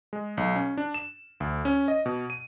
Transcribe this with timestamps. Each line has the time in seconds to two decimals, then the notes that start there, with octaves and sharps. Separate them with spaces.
0.13 G#3
0.37 B1
0.56 C#4
0.78 D4
0.94 E7
1.40 D2
1.65 C#4
1.88 D#5
2.06 B2
2.30 D#7